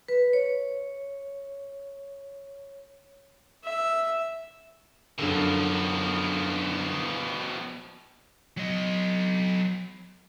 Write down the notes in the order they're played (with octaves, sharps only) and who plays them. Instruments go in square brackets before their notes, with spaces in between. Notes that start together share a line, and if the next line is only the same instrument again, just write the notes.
[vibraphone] B4
C#5
[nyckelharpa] E5
[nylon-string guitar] F#2 D3 [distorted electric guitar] B2 F3 [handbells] D4 G#4 A4
[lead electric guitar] F#3 D#5